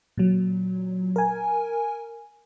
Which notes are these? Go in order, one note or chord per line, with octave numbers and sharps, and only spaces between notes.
A#2 F#3
A#4 G#5